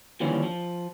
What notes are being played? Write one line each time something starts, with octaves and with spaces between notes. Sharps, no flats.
D#2 D3 E3 F3 G3 C#4
F3